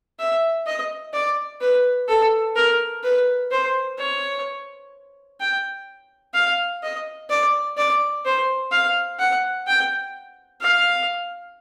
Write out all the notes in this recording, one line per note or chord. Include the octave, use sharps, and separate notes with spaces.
E5
D#5
D5
B4
A4
A#4
B4
C5
C#5
G5
F5
D#5
D5
D5
C5
F5
F#5
G5
F5